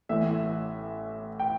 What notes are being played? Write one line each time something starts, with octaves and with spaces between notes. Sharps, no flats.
A1 A2 E3 E5
G5